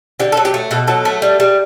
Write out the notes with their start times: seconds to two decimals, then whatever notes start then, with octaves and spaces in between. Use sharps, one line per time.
0.20 D3 G4
0.32 A4
0.37 F#3
0.45 G4
0.54 A3
0.71 B2 A4
0.87 F#3 A4
1.05 A3
1.22 G3
1.40 G3